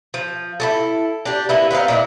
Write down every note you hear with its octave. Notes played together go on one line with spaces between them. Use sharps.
F3
E4 G4 A4
D4 G4
A#3 B3 E4
B3 C4 D#4 F5
A#2 E4 D#5